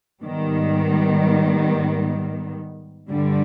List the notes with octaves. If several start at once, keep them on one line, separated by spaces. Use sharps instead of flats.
G#2 D#3 G3 B3
G2 D3 G3